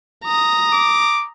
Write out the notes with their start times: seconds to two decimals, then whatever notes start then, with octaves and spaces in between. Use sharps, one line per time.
0.24 A#5 D#6
0.73 D6